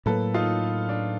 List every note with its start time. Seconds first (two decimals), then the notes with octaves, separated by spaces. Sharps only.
0.06 A2 F#3 A#3 A4 B4
0.34 D#4 F4
0.89 D4